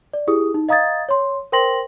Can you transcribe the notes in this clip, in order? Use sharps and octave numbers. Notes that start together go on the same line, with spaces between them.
D5
E4 G4 G#4 D#6
D#4
D#5 F5 A#5 D#6 G#6 A6
C#5 C6
A#4 C5 G5 C6 A#6 F#7